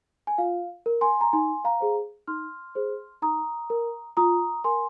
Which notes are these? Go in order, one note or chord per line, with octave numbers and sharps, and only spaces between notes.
G#5
F4 F5
A#4
G#5 C6
A#5
D#4 G#5 C6
F5 A#5
G#4 C5
D#4 C6 F6
G#4 C5
D#4 A#5 D#6
A#4
F4 A#5 D#6
A#4 G#5 C6